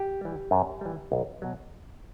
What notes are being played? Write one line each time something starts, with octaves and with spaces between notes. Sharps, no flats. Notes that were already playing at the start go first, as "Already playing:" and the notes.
Already playing: G4
E3 G3
F#2
E3 G3
B1
B2 F#3